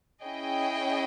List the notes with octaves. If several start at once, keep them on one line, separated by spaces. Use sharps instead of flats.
C#4 E4 G#4 D#5 G5